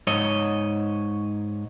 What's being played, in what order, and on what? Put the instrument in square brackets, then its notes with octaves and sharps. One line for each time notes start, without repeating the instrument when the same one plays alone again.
[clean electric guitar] G#2 C#5 D#5